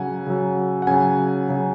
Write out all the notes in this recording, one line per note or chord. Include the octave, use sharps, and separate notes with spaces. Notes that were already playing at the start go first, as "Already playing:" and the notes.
Already playing: C#3 F#3 F#5 G#5
C#3 F#3
F#5
C#3 F#3 G#5
C#3 F#3